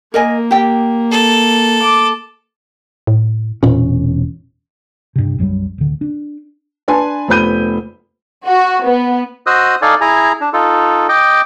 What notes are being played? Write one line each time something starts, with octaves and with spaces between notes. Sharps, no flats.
A#3 A#4 D#5 G#5
G4 G5
A4
D6
A2
E1 A#2 C#4
G2 C3
B1 F#2 F#3 G3
D1 D3
D4
D4 B4 G#5 A5 C6
F1 B3 C5 B5 G6 D#7
F#4
B3
F#4 C5 D#5 D#6 E6 F#6
D#4 A4 D5 F5 G#5
E4 G#4 G#5 A#5
D4
D#4 F4 A4
D#5 G5 D6